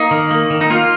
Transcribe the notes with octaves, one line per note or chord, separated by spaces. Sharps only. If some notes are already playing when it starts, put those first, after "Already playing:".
Already playing: A#3 D#4
D#3
A#3
D#3
D#4
A#3 F4